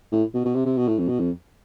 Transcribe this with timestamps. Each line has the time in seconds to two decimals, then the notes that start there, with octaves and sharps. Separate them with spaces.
0.12 A2
0.34 B2
0.45 B2
0.55 C3
0.66 C3
0.77 B2
0.88 A2
0.99 F2
1.08 B2
1.19 F2